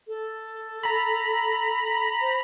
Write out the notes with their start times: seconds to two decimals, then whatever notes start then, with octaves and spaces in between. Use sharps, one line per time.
0.08 A4
0.83 A#5 B5
2.21 C5